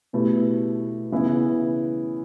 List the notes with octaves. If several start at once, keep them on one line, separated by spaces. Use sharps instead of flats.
B2 A3 E4 G4 B4
C#3 E3 B3 E4